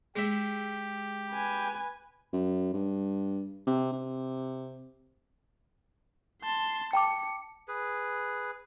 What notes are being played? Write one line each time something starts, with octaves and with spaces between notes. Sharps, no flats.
G#3 G4 E5
B4 G#5
F#2
G2
C3
C3
A5 C6
G5 A5 D6 C#7
G#4 B4